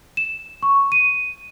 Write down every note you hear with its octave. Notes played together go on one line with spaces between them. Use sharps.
E7
C#6
D#7